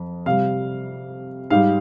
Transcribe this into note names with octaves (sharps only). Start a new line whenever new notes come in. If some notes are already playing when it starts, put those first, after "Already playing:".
Already playing: F2
C3 G3 F5
G#2 G3 F5